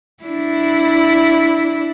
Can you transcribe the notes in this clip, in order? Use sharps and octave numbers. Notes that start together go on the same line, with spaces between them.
D4 E4